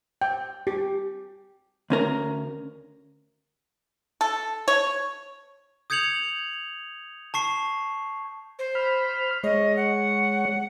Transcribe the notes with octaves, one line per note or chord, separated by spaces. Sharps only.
G5
G4
D2 C#4 A#4 A#5
A4
C#5
D#6 G6 G#6 C#7 F7 F#7
A5 C#6 C7
C5
B5 F6
G#3 C#5 D#5
F#5